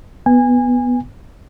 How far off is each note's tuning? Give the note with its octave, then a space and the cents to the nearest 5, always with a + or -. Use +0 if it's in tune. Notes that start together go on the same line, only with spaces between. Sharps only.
B3 +0 G#5 -25